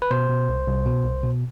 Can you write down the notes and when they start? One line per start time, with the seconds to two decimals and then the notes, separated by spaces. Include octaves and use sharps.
0.02 B4
0.11 B2 C5
0.30 B2
0.49 C2
0.67 C2
0.86 B2
1.05 C2
1.24 B2